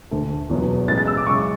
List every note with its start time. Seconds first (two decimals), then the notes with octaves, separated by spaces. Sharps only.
0.11 D2 D3 A3
0.49 E2 B2 F#3 B3
0.88 A1 A2 E3 G#3 A6
0.98 A6
1.07 E6
1.17 D6
1.26 F#2 C#3 G#3 C#6